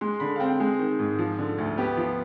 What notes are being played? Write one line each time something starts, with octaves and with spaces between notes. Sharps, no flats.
G#3 C6
D3 B5
F5
C4 G5
G#3 G#4
D#3
G#2
F3
D3
D2
B3 G4
F3